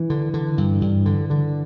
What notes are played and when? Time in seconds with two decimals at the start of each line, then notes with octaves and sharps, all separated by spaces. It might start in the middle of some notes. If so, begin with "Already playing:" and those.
Already playing: E3
0.10 D3
0.34 D3
0.58 G2
0.81 G2
1.06 D3
1.30 D3